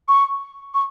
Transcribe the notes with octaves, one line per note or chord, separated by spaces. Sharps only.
C#6
C#6